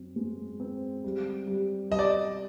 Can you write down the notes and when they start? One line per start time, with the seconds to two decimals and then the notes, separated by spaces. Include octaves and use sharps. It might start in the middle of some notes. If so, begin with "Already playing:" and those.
Already playing: F#2 C4
0.16 G#3
0.60 C4
1.04 G3
1.47 G3
1.90 G3 D#5
1.99 D5